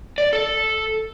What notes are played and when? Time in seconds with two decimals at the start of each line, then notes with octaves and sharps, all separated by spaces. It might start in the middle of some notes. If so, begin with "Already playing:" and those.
0.18 D5
0.33 A4